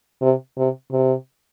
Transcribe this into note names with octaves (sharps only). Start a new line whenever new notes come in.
C3
C3
C3